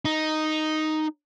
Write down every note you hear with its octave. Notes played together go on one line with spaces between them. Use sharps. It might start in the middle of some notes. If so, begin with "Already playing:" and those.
D#4